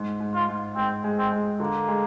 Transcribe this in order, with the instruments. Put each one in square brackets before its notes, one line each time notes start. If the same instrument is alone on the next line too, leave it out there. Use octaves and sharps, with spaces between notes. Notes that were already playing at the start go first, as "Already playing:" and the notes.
Already playing: [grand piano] G#2
G#2
[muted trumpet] F4
[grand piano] G#2
[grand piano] G#2 [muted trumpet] C4
[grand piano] G#3
[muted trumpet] C4
[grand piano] G#3
[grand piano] D3 [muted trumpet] A#3
[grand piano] G#3